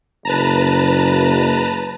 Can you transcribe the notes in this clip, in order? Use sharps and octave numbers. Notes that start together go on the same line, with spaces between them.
F#1 B4 A5 A#5